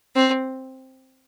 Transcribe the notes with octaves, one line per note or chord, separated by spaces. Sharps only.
C4